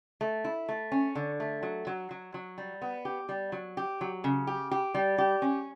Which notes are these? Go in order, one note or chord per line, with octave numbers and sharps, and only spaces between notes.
A3
E4
A3
C#4
D3
A3
F#3
F#3
F#3
F#3
G3
B3
G4
G3
F#3
G4
F#3
C#3
G4
G4
G3
G4
C#4